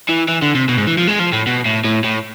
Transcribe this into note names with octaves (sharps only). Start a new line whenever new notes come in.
E3
E3
D3
C3
B2
G#2
E3
F3
G#3
F3
A2
B2
A2
A2
A2